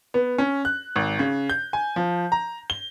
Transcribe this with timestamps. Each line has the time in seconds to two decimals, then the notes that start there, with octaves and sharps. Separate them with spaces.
0.14 B3
0.38 C#4
0.65 F#6
0.96 G#1
1.19 C#3
1.50 G6
1.73 G#5
1.96 F3
2.32 A#5
2.70 G7